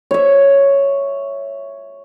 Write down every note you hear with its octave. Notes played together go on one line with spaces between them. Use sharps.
C#5 E5